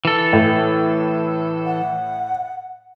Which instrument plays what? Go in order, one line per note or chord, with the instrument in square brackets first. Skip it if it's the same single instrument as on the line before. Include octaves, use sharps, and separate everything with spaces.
[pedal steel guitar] E3 A4
[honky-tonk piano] A2
[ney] F#5